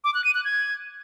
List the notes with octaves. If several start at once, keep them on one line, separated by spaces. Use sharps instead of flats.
D6
F#6
D#7
F#6
G#6